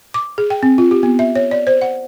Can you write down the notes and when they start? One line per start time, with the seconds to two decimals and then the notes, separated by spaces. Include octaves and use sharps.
0.14 D6
0.38 G#4
0.50 G5
0.63 C4
0.78 F4
0.91 G4
1.03 B3
1.19 E5
1.36 C#5
1.51 D5
1.67 C5
1.82 F#5